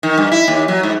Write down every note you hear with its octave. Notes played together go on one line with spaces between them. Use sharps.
D#3
G2
E4
D#2
F#3
G#2